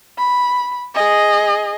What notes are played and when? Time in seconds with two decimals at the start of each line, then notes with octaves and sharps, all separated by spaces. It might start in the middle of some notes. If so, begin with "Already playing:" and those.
0.18 B5
0.95 G#4 D#5